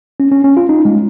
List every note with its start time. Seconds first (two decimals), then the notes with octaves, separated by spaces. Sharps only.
0.20 C#4
0.31 C#4
0.44 C#4
0.57 F4
0.69 D#4
0.85 G#3